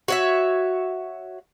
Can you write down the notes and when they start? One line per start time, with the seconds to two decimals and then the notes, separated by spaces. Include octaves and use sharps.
0.08 F#4 C#5 E5